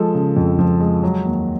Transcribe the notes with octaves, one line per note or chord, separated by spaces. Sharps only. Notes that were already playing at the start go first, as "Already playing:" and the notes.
Already playing: F3 G#3 A4
C#3
F2
F3
G#3
F#3
D#2